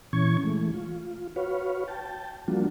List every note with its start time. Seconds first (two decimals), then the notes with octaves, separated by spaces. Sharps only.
0.13 A#2 E3 C#4 C#6 G#6
0.43 E3 G#3 A3
0.74 F4
1.36 F#4 B4 C#5 F5
1.88 G5 A5
2.48 F3 G3 A#3 D4 F4 F#4